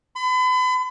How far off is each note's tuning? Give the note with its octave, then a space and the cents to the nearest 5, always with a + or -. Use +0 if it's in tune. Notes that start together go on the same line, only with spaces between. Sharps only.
B5 +40